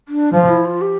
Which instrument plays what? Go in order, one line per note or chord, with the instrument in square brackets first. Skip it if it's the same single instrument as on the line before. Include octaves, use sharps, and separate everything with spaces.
[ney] D4
[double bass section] F3 [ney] F4
[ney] E4
F4
G4